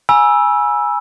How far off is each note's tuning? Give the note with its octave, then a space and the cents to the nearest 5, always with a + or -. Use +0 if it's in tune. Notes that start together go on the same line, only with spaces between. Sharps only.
G#5 +0 B5 -40 E6 +0